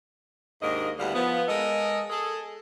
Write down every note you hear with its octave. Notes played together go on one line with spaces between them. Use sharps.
D#2 G#2 A#3 D4 D#5
D2 D3 G3 B3 E4 F5
F3 B3
G#3 A4 A#4 D#5
G#4 A4